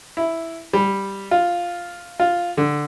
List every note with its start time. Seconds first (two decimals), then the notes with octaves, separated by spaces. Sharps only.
0.17 E4
0.73 G3
1.31 F4
2.20 F4
2.57 D3